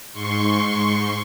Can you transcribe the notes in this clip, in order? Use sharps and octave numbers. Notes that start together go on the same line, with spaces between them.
G#2 C6 C#6